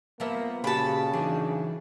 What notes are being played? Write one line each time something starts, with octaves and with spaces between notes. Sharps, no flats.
F3 A#3 B3 E5
A#2 C#3 F#4 G4 A5 B5
E3 F#3 D4 D#4 G#4